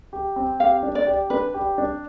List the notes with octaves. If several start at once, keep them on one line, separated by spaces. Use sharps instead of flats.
G4
C4
G4 F5
D4
D5
G4
D4 B4
G4
D4